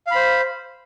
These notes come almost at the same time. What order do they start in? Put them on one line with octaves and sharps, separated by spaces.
F5 B5 C5